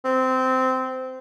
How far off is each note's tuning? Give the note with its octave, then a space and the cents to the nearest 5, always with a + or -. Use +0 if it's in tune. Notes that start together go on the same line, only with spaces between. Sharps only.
C4 -15